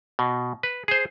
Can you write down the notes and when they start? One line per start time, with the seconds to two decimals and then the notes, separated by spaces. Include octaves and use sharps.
0.19 B2
0.63 B4
0.88 G#4 C5